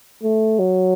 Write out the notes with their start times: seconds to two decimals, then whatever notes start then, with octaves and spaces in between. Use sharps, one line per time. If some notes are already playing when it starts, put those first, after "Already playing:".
0.23 A3
0.59 F#3